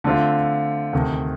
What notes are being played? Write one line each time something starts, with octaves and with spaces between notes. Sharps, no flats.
D3 A3 C4 F4
D2 C3 D#3